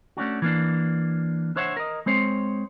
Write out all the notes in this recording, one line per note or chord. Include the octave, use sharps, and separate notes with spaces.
A3 C#4 D4 F#4
E3 A#3 D4
D4 C5 C#5 E5 F#5
A#4 D#5
G#3 C4 C5 C#5